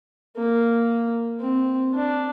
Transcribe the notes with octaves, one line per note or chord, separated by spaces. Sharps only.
A#3
C4
D4